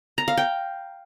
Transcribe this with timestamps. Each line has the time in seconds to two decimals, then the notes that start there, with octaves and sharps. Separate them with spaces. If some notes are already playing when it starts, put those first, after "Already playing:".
0.18 A#5
0.28 F5
0.37 G5